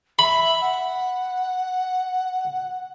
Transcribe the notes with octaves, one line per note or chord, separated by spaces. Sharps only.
E5 B5
F#5